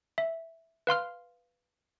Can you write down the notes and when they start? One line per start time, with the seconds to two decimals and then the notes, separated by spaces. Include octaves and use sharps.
0.18 E5
0.87 B4 F5 C6 F6